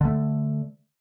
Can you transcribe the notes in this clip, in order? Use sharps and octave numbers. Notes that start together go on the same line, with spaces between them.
D3 A3